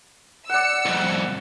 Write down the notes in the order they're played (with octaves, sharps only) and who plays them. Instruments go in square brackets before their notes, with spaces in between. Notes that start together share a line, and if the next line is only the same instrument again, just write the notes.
[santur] D5 F#5 [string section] E6 C#7
[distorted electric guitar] C2 F2